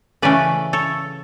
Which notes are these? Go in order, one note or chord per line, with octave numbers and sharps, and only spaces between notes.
C#3 E3 A3 C#4 B4 D5
A4 C#5